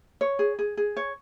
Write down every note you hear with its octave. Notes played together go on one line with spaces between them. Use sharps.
C#5
G#4
G#4
G#4
C#5